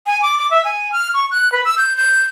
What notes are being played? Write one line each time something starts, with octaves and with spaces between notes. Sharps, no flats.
G#5
D6
D6
E5
G#5
F6
C#6
F#6
B4
E6
G6
G6